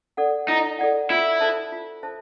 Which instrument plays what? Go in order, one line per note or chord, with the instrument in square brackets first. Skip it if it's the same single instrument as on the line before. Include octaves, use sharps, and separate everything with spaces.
[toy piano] A4 D5 F#5
[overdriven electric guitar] D#4 [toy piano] E4
[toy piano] A4 D5 F#5
[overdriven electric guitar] E4 [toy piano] F4
[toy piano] A4 C5 E5 A5
F4
A4 C5 E5 A5